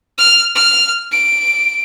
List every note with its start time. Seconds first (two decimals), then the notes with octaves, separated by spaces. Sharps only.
0.18 F6
0.55 F6
1.12 D7